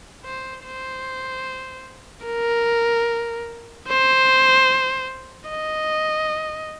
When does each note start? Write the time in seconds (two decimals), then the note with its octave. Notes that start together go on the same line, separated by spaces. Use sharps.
0.25 C5
0.66 C5
2.27 A#4
3.88 C5
5.50 D#5